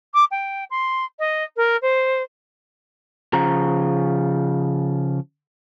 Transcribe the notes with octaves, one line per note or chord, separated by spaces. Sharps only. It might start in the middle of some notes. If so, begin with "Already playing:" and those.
D6
G5
C6
D#5
A#4
C5
C#3 F3 A#5